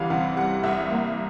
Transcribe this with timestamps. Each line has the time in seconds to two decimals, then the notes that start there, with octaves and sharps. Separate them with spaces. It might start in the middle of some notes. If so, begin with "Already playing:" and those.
Already playing: C2 E3 G3 F5 F#5
0.10 C3 F#5
0.37 G3 F#5
0.64 C2 E5
0.90 A#3